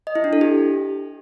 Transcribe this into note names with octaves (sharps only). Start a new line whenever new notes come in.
D#5
E4
D4
A4
G4